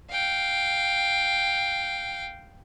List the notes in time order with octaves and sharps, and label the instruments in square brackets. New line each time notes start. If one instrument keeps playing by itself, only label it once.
[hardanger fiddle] F5 G5